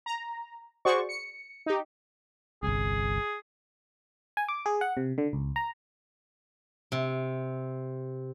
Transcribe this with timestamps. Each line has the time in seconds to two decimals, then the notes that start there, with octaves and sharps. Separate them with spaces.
0.06 A#5
0.85 F#4 G#4 C5 D5 C#6
1.09 C#7
1.66 D#4 G4
2.63 G1 C2 G#4
4.37 G#5
4.48 D6
4.66 G#4
4.81 F#5
4.97 C3
5.18 D3
5.33 C#2
5.56 A#5
6.92 C3